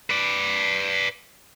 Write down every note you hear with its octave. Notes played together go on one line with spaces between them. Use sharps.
B4 D5